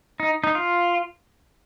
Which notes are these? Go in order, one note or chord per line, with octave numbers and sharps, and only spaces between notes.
D#4
D#4
F4